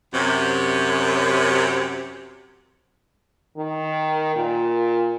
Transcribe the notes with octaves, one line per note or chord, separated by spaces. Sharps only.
F#2 C3
D#3
A#2